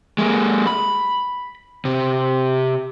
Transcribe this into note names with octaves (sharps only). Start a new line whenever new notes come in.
G#3 A#3
B5
C3